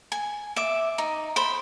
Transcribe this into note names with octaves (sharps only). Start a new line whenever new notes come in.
G#5
E5 D6
D#4
C5 B5